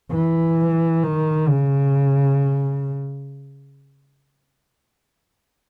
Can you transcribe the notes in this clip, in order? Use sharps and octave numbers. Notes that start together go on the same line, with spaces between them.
E3
D#3
C#3